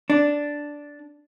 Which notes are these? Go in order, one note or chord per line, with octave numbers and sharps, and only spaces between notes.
D4